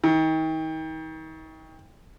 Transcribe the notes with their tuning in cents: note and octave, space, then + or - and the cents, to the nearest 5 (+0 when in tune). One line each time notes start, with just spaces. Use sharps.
D#3 +35